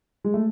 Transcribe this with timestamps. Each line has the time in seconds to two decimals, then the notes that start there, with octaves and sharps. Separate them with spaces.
0.24 G#3
0.34 A3